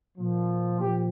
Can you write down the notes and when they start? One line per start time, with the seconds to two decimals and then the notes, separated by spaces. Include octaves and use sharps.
0.18 A#2 F3
0.79 A#2 F3 G4